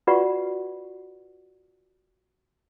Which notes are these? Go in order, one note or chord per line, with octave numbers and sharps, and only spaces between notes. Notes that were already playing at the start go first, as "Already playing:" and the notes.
F4 F#4 B4 D5 F#5 C#6